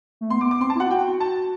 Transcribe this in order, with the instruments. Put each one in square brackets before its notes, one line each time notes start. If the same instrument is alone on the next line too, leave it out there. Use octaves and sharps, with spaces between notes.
[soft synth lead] A3
[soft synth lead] B3 [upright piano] C6
[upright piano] D6
D6
[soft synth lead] C4 [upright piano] C6
[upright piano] A5
[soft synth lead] E4
[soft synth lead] F#4 [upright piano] F#5
[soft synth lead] F#4 [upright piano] G5
[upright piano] A5